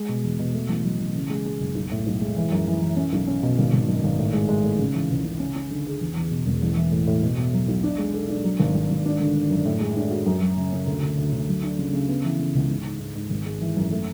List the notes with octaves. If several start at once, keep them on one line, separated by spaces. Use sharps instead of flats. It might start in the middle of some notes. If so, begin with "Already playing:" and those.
Already playing: G#3
B2
E2
B2
A3
A1
F#3
A1
C#3
G#3
G#3
F#1
B1
A2
B1
G#3
E3
F#2
E3
E3
C#4
B1
C#4
B2
G#1
G#1
F#2
G#1
A2
G#3
G#3
A2
C#3
E3
C#2
C#3
C#4
C#4
D3
G#4
E2
E2
B2
E1
A1
E3
A2
A2
B2
B2
F#3
B1
D4
G#3
A4
D4
F#3
G#1
G#1
G#1
D4
D3
D3
F#2
A2
G#3
D4
F#4
F#2
F#3
C#3
C#3
D2
D2
D2
D2
F#3
D4
C#3
C#3
B3
E3
C#3
C#2
G#2
G#2
G#2
G#2
G#1
G#3
E3
F#2
A3